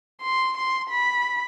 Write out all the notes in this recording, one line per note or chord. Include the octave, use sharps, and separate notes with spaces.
C6
C6
B5